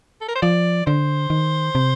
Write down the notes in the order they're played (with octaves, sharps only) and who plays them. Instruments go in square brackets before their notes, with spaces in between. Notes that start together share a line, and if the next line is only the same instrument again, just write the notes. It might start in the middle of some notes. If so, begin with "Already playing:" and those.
[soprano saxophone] A4
A#4
C5
[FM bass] F3 [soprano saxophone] D5
[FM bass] D3 [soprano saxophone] C5
[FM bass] D#3
C3